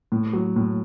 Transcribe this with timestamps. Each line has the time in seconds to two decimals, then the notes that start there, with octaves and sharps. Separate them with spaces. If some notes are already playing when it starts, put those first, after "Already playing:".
0.12 A2
0.33 F#3
0.56 A2